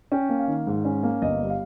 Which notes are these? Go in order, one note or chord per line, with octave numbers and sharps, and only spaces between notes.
C#4 G5
A#3
F5
D#3
G#2
C#4
A#3
G1 D#5
G3
F5